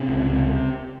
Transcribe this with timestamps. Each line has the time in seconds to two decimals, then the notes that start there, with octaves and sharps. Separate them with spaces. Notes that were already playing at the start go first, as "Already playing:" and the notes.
Already playing: C3 C#4
0.09 C#2
0.30 C3